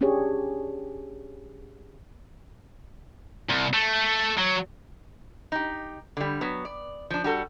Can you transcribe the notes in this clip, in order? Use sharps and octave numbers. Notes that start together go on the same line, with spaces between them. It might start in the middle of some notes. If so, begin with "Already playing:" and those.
C#4 D4 G4 G#4 C#5
C2
A3
F#3
D#4 G4
D3 G3
F#3 B3
D5
F3 D4
G3 F#4 A4